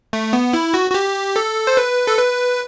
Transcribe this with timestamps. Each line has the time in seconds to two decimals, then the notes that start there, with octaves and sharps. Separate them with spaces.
0.13 A3
0.33 B3
0.53 E4
0.74 F#4
0.90 F#4
0.94 G4
1.36 A4
1.67 C5
1.77 B4
2.07 A4
2.17 B4